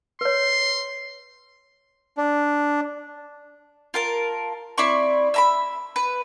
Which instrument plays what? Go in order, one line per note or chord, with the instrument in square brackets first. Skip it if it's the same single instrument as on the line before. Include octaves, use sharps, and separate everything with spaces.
[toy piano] B4 C#5 [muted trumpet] C6
[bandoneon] D4
[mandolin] F4 A#4 A5
C4 E4 D5 C#6
E5 A#5 B5
B4